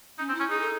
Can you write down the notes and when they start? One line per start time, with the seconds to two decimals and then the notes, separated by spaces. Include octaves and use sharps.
0.18 C#4 D#4
0.29 C4
0.35 E4
0.40 C#4
0.50 D#4 G#4
0.61 A4